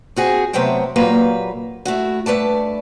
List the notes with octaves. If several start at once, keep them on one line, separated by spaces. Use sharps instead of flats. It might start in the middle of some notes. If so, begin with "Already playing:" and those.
C4 F#4 G#4
C3 F#3 A3 B3 C5 G5
A#2 F#3 A#3 G4 B4
A3 E4 F#4
G2 A3 B4 D5 A5